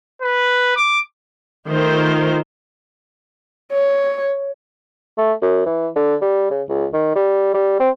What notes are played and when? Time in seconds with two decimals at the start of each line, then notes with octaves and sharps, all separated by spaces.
0.22 B4
0.76 D6
1.68 D#3 A3 F4 C5
3.72 C#5
5.18 A3
5.42 F#2
5.66 E3
5.96 D3
6.21 G3
6.51 C#3
6.69 C#2
6.93 D#3
7.15 G3
7.54 G3
7.80 C4